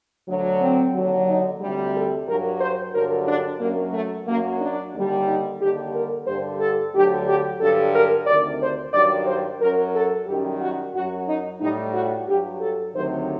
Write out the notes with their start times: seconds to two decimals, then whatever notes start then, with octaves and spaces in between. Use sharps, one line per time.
0.27 D2 D3 F#3
0.60 C4
0.94 D#2 D3 F#3
1.27 D#4
1.60 D2 C3 G3
1.94 A4
2.27 G2 F#3 A#4
2.60 C5
2.94 G2 D3 F#3 A#4
3.27 D4
3.60 F#2 F#3 A#3
3.93 A3
4.27 F#2 F#3 A#3
4.60 D4
4.94 D#2 D3 G3
5.27 D#4
5.60 D#2 D3 G3 G4
5.94 A#4
6.27 G2 D3 G3 C5
6.60 A4
6.93 D2 D3 F#3 G4
7.27 G4
7.60 G2 D3 F#3 A4
7.94 A#4
8.26 D2 C3 D#3 D5
8.60 C5
8.93 G2 D#3 F#3 D5
9.27 C5
9.61 F#2 F#3 A#4
9.94 A4
10.27 F#2 D#3 G3 G4
10.60 F#4
10.94 F#2 F#3 F#4
11.27 D#4
11.60 A2 G3 D#4
11.93 F#4
12.27 G2 F#3 G4
12.60 A4
12.94 D2 C3 D#3 F#3 C5